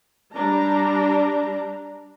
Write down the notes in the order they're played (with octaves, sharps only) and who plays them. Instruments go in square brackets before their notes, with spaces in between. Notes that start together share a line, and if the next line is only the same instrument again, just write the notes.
[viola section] G3 D4 A#5